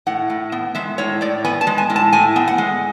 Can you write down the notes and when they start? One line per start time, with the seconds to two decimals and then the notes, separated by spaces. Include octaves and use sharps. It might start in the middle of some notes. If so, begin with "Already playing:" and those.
0.07 A2 F#5
0.30 A2
0.52 B3
0.75 G#3 E5
0.98 A2 C#5
1.21 A2 D5
1.45 B3 G#5
1.61 A5
1.67 G#3
1.78 G#5
1.90 A2
1.96 A5
2.13 A2 G#5
2.36 B3
2.48 F#5
2.58 G#3